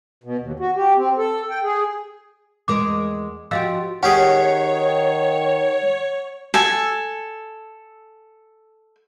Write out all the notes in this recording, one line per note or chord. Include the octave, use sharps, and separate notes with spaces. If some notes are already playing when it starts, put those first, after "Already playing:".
B2
D#2
F#4
G4
C4
A4
G5
G#4
E2 G#3 A#4 D6
F3 F#4 G4 D#5 F5 E6
D#3 C#4 G4 G#4 C#5 F#5
A4 G#5